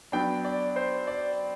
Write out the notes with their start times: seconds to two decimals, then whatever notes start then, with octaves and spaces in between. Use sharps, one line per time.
0.12 F#3 B3 D4 G5
0.45 D5
0.76 C5
1.07 D5